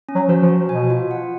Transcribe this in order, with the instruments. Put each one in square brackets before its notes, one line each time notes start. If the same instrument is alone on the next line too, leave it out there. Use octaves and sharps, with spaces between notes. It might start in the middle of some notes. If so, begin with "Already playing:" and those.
[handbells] C#4
[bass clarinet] F#3
[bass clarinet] F3 [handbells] F#4
[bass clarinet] F3
[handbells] F#4
[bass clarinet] B2 [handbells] G#5
[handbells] F4
F#5